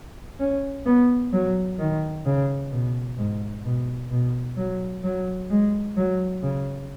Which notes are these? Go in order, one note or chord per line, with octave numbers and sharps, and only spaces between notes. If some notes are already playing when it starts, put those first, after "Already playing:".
C#4
B3
F#3
D#3
C#3
B2
G#2
B2
B2
F#3
F#3
G#3
F#3
C#3